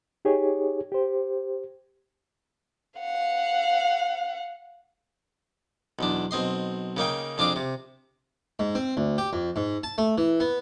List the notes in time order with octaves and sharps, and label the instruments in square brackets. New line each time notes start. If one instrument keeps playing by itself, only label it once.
[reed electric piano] D#4 G4 G#4 C#5
G4 C5
[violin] F5 F#5
[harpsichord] B1 E2 D4
B1 C4 D#5 C6
C#3 A#3 D#4 G5
F2 D4 F4 G#4 D6
C3
G#2
C4
D2
G4
F2
G#2
A5
A3
E3
B3